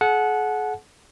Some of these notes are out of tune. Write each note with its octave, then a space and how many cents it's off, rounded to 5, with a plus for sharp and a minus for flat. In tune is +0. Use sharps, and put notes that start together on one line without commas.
G#4 +45 F#5 -10 A5 -40